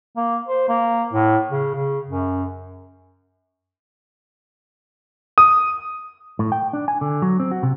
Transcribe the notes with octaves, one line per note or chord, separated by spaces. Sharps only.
A#3
C5
A#3
A2
C#3
C#3
F#2
D#6
A2
G5
D4
G#5
D3
F#3
C4
F#4
C3